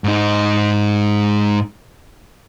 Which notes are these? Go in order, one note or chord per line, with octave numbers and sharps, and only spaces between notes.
G#2 D#4